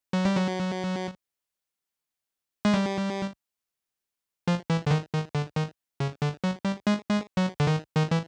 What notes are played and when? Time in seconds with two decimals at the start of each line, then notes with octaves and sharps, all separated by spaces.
0.13 F#3
0.25 G3
0.36 F#3
2.65 G#3
2.74 G3
4.48 F3
4.70 E3
4.87 D3
4.91 D#3
5.13 D#3
5.35 D3
5.56 D#3
6.00 C#3
6.22 D3
6.44 F#3
6.65 G3
6.87 G#3
7.09 G#3
7.37 F#3
7.60 D3
7.67 D#3
7.96 D#3
8.11 E3